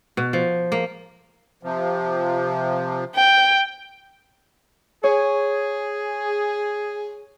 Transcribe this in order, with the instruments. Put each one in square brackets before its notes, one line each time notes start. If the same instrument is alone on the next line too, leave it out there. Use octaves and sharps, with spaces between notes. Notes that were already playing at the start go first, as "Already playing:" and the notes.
[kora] B2
F3
A#3
[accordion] C3 F3
[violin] G5
[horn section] G#4 [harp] C#5